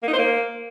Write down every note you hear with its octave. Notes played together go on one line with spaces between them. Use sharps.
A#3
D#4
C5
A#3